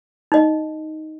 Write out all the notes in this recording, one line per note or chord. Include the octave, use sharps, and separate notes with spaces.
D#4 D#5